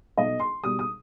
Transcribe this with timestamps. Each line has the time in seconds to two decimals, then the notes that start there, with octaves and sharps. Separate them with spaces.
0.17 B1 D#5
0.40 C6
0.63 B2 G3 D#6
0.79 D#6